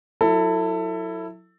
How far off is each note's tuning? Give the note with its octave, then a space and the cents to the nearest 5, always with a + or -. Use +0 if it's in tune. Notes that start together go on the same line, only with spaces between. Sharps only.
F#3 -30 E4 +0 A4 +25